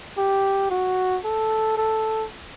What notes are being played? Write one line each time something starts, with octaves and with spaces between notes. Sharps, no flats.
G4
F#4
A4
A4